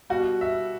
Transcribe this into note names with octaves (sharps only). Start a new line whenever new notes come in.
B2 G3 F#4
E5